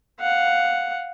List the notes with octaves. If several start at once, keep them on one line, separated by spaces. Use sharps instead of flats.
F5 F#5